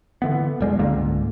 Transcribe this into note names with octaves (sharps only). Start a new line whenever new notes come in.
D3 E3 B3
E1 G3 G#3
C#2 G#2 D3 A#3